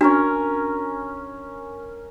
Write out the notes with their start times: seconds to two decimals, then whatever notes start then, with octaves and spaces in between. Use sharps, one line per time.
0.01 C#4 D4 F#4 A#4 G#5